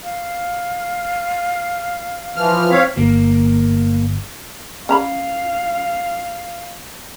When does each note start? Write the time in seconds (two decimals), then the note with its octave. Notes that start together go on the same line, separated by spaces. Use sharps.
0.03 F5
2.36 E3 F3 F6
2.71 C4 C#5 F5 B6
2.97 G1 A#3
4.89 C#4 F5 A#5 B5